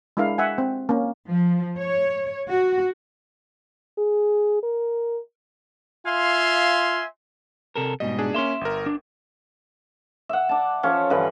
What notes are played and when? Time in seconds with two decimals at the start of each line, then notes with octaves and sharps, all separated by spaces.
0.17 G#3 D4 E4 A#4 F5
0.38 E5 F#5 G#5
0.58 C4
0.89 A#3 C#4
1.30 F3
1.78 C#5
2.49 F#4
3.98 G#4
4.63 A#4
6.06 F4 E5 F5 G#5 C6
7.76 C3 A4 A#4
8.00 G#2 B2 G3 D#5
8.19 D4 G#4
8.34 A#3 C#4 E5 C6
8.61 G1 A#4
8.86 D4
10.29 E5 F#5
10.49 D4 A5
10.83 F3 C#4 A4 C#5
11.10 G2 D3 E3 B4